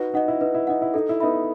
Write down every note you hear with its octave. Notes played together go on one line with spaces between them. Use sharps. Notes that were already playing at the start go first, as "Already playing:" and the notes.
Already playing: D#4 F#4 B4
D#4 D#5 F#5
E4
D#4 B4
E4
D#4 D#5 F#5
E4
D#4 A4
E4
B3 D#4 E5 B5